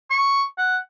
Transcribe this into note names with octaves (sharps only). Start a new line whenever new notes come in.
C#6
F#5